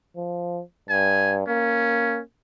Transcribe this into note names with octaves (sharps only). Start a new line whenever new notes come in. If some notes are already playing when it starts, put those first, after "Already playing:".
F3
G2 G#5
A#3 C#4